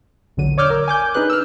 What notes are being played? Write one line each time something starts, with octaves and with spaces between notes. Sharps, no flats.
A#1 E2 D3 F#3 D#7
C#5 D5 D6 E6 F6 G6
A#4
G#5 D6 G6
D4 D#4 G#4 B4 F#6
E6 F6